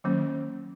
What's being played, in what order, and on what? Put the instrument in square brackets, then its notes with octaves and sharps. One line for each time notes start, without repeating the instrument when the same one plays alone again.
[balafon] D#3 F#3 A#3 C#4